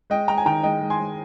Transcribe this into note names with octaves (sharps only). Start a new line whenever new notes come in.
G#3 D#5 G5
G#3 G5 A#5
G#5
D#3 G5 A#5
G#3 D#5 G5
G#3
G#5 C6
G#3